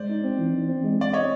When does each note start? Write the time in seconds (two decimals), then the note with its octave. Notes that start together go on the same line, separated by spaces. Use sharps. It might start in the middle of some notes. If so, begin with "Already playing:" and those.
Already playing: G#3 C5 D5
0.09 D#4
0.24 C4
0.38 E3
0.53 E3
0.68 C4
0.83 G#3
0.98 G#3 D5
1.13 C4 C#5 D#5